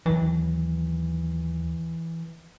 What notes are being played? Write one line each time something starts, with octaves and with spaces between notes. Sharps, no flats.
D#2 E3 F#3